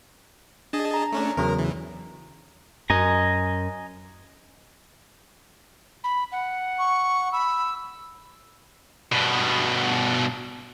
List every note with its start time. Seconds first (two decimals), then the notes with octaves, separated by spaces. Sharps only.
0.73 D4 G#4 D#5 A5
0.94 A#5
1.12 A3 C#4 D4
1.37 E2 C#3 F#3 A#4
1.59 E3
2.90 F#2 D#5 G#5 A#5
6.04 B5
6.32 F#5
6.79 C#6
7.32 B5 E6
9.12 G2 B2